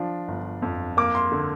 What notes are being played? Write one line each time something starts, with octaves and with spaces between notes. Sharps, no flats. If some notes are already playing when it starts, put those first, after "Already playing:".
Already playing: F3 D4
G1
F2
A#3 D6
C6
D3